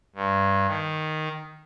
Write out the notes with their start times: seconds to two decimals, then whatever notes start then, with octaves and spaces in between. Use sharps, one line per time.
0.16 G2
0.67 D#3